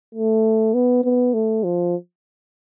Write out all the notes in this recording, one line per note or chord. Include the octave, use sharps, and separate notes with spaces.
A3
B3
B3
A3
F3